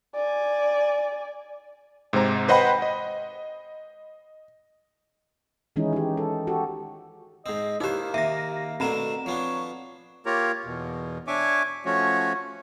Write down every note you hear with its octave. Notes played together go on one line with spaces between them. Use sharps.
D5 G#5
G#2 C3 G#3 C5 A#5
B4 C5 D#5 F#5 G5 B5
D#5
D#3 E3 G#3 C#4 D#4 E4
D#4 G4
A4
F#4 G4 A4
G#2 C4 D#5
A#3 D#4 E4 G4 C5
D#2 C3 E5 A#6
B2 A3 C4 D4 A#5 E7
F3 B3 D4 C#5
A#3 F4 G4 A#4 C#5 A#5
E2 B2
D4 C#5 E5 G#5 C#6 D6
F3 A3 C#4 F#4 C#5